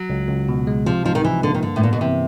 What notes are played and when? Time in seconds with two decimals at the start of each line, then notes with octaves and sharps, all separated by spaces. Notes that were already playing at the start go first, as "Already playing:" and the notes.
Already playing: F#3
0.10 C#2
0.29 C#2
0.49 B2
0.67 G#3
0.86 C3 F3
1.05 F3 D#4
1.15 D#3
1.24 E3 F3
1.43 D3 A#3
1.54 D#3
1.63 G2 D3
1.76 A2
1.82 A#2 B3
1.93 B2
2.01 C3 E3